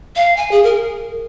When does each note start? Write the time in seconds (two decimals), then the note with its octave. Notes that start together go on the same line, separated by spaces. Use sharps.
0.16 F5
0.37 G#5
0.51 G#4
0.64 A#4